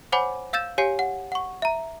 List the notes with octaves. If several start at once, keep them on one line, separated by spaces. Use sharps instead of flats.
C5 C#5 F#5 G#5 B5 D6
F5 E6 G6 A6 E7
G4 C#5 F5 G#5 C7
F#5
F#5 C#6
E5 A#5